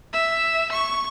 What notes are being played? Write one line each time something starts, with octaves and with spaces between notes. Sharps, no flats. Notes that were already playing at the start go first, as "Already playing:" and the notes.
E5
C#6